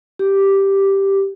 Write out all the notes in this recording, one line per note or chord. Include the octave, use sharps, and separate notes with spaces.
G4